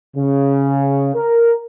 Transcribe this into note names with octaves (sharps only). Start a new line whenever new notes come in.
C#3
A#4